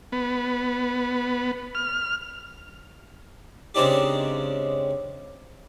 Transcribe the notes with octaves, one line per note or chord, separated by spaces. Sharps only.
B3
F6
C#3 G#3 C4 D4 D#4 G4